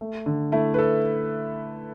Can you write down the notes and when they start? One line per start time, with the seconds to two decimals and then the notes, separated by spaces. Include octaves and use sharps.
0.01 A3
0.26 D3
0.52 A3 E4
0.74 B4
0.79 A4